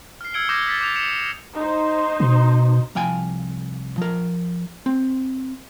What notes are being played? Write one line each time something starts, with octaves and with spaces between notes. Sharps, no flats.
F6 C7
E6 F6 G#6 C#7 D7 G7
D6 D#6 G6 G#6 A#6
A6 B6
D6 G6 A6 F7
G6 C#7 E7 F7
D#4 C5
B2
C2 F3 F5 G5 G#5
F3 A#4
C4